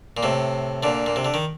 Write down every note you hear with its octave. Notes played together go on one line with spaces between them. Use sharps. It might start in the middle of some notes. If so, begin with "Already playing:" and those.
A#2
A2 C3
A#2 D3
A#2
C3
D3
D#3